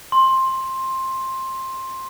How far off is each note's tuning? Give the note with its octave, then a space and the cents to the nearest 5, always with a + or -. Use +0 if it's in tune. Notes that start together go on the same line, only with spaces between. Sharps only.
C6 +15